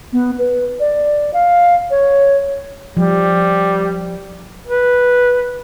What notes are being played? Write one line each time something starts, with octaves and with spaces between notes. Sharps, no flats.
B3
B4
D5
F5
C#5
F3 G3
B4